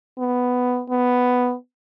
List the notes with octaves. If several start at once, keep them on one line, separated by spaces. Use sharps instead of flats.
B3
B3